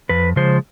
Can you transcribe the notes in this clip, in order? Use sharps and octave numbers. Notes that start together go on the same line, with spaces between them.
F2 B4
C#3 F3 G#3 C5